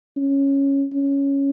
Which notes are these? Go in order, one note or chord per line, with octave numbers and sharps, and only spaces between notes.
C#4
C#4